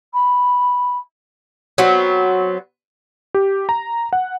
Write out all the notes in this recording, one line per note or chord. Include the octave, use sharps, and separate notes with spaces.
B5
F#3 B3 C4
G4
A#5
F#5